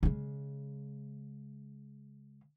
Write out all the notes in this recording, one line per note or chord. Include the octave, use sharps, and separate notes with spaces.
C#3 G#3